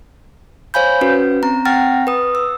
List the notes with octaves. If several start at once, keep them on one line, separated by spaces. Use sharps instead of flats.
C5 C#5 F5 G#5 B5 G6
C#4 F#4 B4
C4 A#5
C4 F#5 G5 F6 A6 A#6
B4 D#6
E6